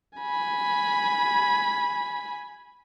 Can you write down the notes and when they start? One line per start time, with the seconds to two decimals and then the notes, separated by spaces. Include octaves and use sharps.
0.19 G#5 B5